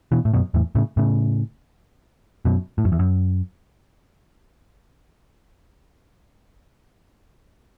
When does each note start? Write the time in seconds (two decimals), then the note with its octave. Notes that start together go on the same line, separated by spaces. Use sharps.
0.12 B2 E3
0.25 A2
0.34 F#2 B2
0.54 E2 A2
0.75 A2 C#3
0.97 A2 C#3
2.45 F#2 B2
2.78 A2
2.85 F#2
2.92 E2
2.99 F#2